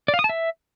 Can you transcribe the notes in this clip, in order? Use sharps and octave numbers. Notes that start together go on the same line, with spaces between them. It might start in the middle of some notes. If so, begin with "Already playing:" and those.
D5
F5
D#6
A5
E5